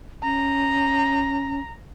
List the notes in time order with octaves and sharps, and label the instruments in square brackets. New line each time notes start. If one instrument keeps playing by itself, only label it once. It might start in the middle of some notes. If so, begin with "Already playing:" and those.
[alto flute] C#4 [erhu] A#5